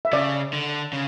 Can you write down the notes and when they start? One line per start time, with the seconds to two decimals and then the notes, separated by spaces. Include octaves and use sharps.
0.05 E5
0.12 C#3 D5
0.53 D3
0.93 C#3